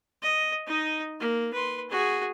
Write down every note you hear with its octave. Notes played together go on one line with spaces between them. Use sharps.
D#5
D#4 D#5
A#3
B4 C6
F#4 G#4